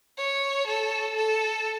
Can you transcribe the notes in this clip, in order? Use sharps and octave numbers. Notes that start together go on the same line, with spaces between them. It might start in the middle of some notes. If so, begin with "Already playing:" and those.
C#5
A4
A4